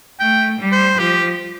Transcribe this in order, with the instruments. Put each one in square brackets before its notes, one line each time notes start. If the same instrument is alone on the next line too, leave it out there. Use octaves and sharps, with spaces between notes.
[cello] A3 [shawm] G5
[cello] G3
[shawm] C5
[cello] F3 [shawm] G4